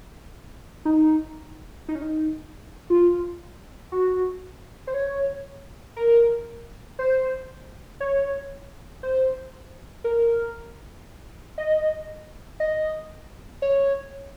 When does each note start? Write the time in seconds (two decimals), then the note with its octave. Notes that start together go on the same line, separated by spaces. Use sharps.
0.85 D#4
1.88 D#4
1.95 C#4
2.02 D#4
2.90 F4
3.92 F#4
4.87 C5
4.94 C#5
5.96 A#4
6.99 C5
8.00 C#5
9.03 C5
10.04 A#4
11.58 D#5
12.60 D#5
13.62 C#5